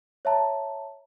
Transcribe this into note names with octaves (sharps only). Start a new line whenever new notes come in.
C#5 E5 A5 A#5